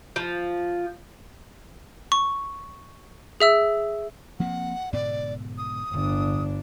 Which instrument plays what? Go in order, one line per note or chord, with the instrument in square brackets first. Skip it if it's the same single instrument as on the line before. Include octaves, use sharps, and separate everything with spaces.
[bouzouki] F3
[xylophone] C#6
G#4 E5 E6
[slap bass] F3 A#3 C4 [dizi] F#5
[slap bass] G#2 B2 D3 [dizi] D5
[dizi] D#6
[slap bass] D1 [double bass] G1 D4